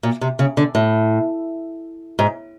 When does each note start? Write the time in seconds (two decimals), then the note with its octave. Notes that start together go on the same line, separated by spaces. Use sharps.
0.03 A#2
0.21 C3
0.39 C#3
0.57 D3
0.75 A2
2.19 G#2